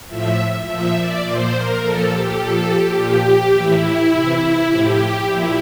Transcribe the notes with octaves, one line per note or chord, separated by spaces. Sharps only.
A2 F3 E5
A#2 F3 E5
D5
A#2 F3 C5
A#4
A#2 F3 A4
G4
A#2 F3 A4
G4
A#2 F3 G4
A2 E3 E4
C3 E3
A2 F3 G4
A#2 F3 E4